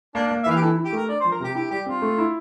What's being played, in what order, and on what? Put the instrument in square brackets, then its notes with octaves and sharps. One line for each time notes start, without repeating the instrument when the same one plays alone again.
[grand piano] A#3 [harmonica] D4
[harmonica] D4
[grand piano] A#3
[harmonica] E5
[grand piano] E3 [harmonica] F5
[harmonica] G4
[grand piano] E4 [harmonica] A4
[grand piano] E4
[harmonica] G4
[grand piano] A3 [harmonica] A#4
[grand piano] D4 [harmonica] D5
[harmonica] C5
[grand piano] F3
[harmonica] A#4
[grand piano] C3 [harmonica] G4
[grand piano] E4 [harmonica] G4
[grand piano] G3 [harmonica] G4
[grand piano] C4 [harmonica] F4
[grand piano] A3
E4